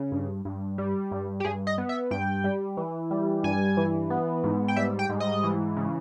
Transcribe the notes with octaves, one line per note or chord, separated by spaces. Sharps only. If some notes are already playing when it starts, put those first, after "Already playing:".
Already playing: C#3
G2
G2
G3
G2
G4
G2 G#4
D#5
B3
E5
G2 G5
G3
E3
G3
G2 G#5
E3
B3
G#2
G5
G3 E5
G5
G#2
D#5
E3
C#3